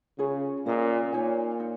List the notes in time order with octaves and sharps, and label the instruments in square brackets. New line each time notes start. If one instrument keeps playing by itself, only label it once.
[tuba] C#3 [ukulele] F4 G#4 C#5
[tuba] A#2 [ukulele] C#4 A#4 D#5 A#5
[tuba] A#2 [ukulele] D#4 C#5 G#5
[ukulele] D#4